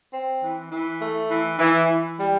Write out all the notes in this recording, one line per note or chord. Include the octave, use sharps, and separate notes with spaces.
C4
E3
E3
A3
E3
E3
E3
G3